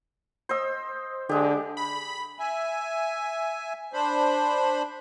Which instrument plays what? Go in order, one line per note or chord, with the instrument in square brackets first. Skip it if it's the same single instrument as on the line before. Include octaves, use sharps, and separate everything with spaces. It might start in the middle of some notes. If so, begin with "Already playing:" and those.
[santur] C5 D#5 E6
[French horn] D3 [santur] G#3 G4
[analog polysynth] B5
[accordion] E5 G#5
D4 C5 B5